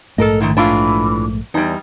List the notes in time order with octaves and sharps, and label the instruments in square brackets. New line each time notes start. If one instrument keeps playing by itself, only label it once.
[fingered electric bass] A#1 G#2 A3 [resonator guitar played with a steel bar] A4 A#4 D#5
[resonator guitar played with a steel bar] A2 D3 D#3
[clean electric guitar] A2 E3 [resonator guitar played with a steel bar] D4 F4
[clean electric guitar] E2 [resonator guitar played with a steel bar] G3 D#4